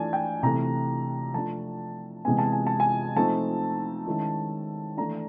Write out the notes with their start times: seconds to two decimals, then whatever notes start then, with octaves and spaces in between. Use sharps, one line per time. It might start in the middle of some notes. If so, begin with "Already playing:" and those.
Already playing: E3 A3 D4 G#5 A5
0.13 G5
0.43 C3 E3 A3 A#5
1.34 F3 A3 D4 A5
2.25 C3 E3 G#3 B3 G#5
2.39 A5
2.52 G#5
2.67 A5
2.80 G#5
3.16 F3 A3 C4 D#4 A5
4.07 D#3 G#3 C#4 E4
4.97 E3 A3 D4 A#5